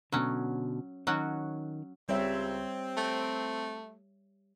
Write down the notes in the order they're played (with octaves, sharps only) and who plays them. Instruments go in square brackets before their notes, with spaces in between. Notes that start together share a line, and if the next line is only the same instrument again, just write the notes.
[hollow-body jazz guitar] B2 D3 [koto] F#3 C#4
[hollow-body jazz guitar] D#3 [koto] F#3 C#4 F#4
[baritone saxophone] C#2 [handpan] G3 C#5 E5 [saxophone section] C4
[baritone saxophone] A3